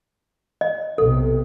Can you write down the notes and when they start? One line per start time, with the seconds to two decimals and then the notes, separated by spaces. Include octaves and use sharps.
0.61 D#5
0.98 B1 C3 A4